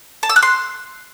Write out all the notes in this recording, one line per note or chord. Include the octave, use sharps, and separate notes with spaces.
A5
E6
F#6
C6